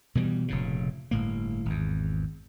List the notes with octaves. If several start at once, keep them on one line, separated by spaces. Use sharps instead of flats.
B2 E3 G3
F1 A#2 C#3
G1 A2 A#3
G#1 E2